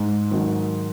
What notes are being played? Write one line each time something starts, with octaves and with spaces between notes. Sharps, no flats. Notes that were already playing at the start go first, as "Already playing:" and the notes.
Already playing: G#2
D#3 F#3